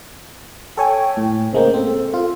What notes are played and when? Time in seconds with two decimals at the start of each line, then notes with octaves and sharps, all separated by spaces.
0.77 A4 C#5 G5 G#5
1.17 A2
1.53 C#3 G#3 A#3 C5
1.74 C4 A4
2.14 F4